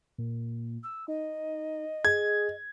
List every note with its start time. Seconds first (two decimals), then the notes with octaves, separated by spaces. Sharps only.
0.18 A#2
0.83 E6
1.08 D#4 D#5
2.05 G#4 G#6